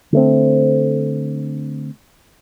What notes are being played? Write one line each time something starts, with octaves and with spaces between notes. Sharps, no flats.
D3 A3 C4